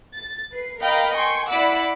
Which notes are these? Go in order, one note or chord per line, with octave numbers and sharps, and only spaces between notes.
A6
B4 C7
A#4 D#5 F5 G5 A#5 B5
G5 G#5 C6 C#6
E4 D5 F#5 B5 D6 E6